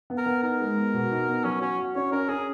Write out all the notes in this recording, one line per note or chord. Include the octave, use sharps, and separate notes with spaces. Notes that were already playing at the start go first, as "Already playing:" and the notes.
B3
A#4
B3
D#4 A#4
G#3
B3
B2
D#4
B3
F#3 C#4
C#4 F#4
F#4
C#4 C#5
C#4 A#4
C#4 G#4